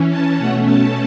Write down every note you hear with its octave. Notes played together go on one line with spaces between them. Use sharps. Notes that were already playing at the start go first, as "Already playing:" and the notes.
Already playing: E3 C#4
A5
B2 A3 C#4 F#5
A5